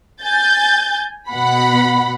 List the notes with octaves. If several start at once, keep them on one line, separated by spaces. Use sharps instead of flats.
G#5 G6 A6
B2 F#5 B5